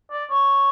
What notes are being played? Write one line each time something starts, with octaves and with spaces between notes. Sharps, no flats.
D5
C#5